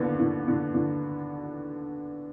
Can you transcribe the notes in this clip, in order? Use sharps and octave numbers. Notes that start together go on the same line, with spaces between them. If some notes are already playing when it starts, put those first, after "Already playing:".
Already playing: D#2 D3 B3
D3
D3
D3